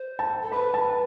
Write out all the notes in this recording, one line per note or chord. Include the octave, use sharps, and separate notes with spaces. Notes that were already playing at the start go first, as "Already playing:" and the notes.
Already playing: C5
A5
A4
B4 B5
A5